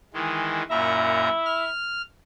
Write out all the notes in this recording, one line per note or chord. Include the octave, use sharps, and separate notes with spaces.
D#3 E3 G#3
F#2 A#2 E4 E5 A#5
F6